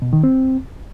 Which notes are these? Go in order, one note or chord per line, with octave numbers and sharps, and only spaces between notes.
B2
D#3
C4